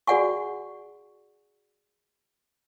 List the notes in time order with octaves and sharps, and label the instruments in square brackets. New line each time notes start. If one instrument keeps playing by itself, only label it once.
[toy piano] F#4 G#4 D5 F#5 G#5 C#6